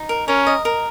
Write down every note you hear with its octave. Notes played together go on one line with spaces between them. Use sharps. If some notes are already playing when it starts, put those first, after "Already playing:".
Already playing: D#4
A#4
C#4 A#4
D#5
A#4